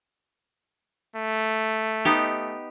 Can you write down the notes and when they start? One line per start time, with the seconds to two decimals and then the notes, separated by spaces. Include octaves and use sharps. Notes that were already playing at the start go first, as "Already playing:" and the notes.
1.16 A3
2.05 B3 D#4 G4